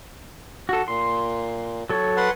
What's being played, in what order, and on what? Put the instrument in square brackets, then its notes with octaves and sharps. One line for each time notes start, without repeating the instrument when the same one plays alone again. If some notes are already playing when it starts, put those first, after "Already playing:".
[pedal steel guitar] F#4 A4
[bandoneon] A#2 [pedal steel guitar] C6
[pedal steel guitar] F#3 A4 C#5
[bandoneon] B4 F#5 C6